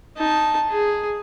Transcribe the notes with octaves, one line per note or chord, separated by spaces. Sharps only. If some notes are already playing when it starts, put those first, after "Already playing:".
D#4 A5
G#4